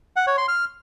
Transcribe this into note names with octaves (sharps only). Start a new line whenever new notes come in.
F#5
C#5
C6
F6